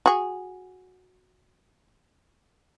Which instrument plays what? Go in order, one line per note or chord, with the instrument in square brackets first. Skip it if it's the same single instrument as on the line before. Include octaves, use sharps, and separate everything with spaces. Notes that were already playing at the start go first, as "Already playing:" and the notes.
[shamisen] F#4 G#4